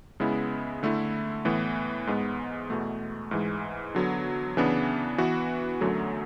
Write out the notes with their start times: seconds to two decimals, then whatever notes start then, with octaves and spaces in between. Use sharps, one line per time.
0.20 C#3 G#3 B3 E4
0.83 D3 A3 E4
1.45 A2 E3 B3
2.07 G#2 G#3 B3
2.70 E2 B2 A3
3.31 G#2 E3 G#3
3.95 D3 F#3 B3
4.57 C#3 E3 B3 D4
5.18 E3 B3 F#4
5.81 F#2 D3 F#3 A3